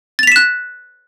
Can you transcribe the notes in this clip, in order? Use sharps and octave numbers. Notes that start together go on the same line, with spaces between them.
F#6 A6 B6 E7 F7